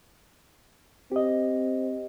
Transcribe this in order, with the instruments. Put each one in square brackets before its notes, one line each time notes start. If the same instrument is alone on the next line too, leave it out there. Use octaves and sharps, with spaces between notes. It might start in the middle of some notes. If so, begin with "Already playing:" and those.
[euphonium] C4 [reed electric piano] G4 D#5